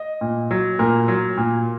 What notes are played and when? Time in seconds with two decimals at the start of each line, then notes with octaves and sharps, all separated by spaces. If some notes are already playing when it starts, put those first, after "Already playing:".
Already playing: D#5
0.21 A#2
0.51 F#3
0.79 A#2 A#4
1.08 F#3
1.38 A#2